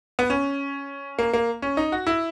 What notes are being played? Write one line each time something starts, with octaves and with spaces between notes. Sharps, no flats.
B3
C#4
A#3
A#3
C#4
D#4
F#4
E4